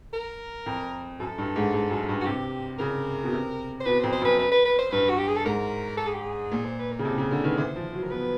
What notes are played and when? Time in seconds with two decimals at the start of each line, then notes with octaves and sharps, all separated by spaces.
0.14 A#4
0.66 F2
1.20 F#2 A4
1.38 G2
1.56 G#2
1.73 G#2
1.90 F#2
2.09 G2
2.21 F#4
2.26 C3 G4
2.79 C#3 A#4
3.24 B2
3.32 C3
3.80 C5
3.86 B2 B4
3.99 F2 C5
4.13 C5
4.21 F#2 B4
4.39 B4
4.52 B4
4.65 B4
4.79 C5
4.92 G2 B4
5.10 F#4
5.18 G4
5.28 G#4
5.36 A4
5.44 G#2 A#4
5.98 A4
6.07 G#4
6.14 G4
6.22 G#4
6.52 A#2
6.65 C5
6.79 B4
6.92 A#4
6.99 C#3
7.05 C3 A4
7.18 C#3
7.31 D3 A#4
7.44 D#3 B4
7.58 E3 C5
7.76 F3
7.93 F#3
8.03 A#4
8.11 B3 B4